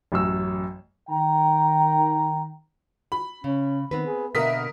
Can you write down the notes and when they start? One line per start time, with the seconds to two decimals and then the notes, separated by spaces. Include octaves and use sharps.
0.12 A1 F#2 E6
1.09 D#3 G5 A#5
3.12 B5
3.44 C#3 C#4
3.91 D#3 B3 C4 B4
4.07 G#4
4.35 B2 D3 A#3 A#4 E5 D#6 B6